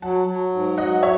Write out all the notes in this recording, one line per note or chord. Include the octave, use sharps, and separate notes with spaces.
F#3 F#5 A5
F#3
G#2
F#3 D#5 F#5
C#5 E5